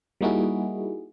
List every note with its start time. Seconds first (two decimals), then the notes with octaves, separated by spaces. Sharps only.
0.21 G3 A#3 D#4 E4 F#4 G#4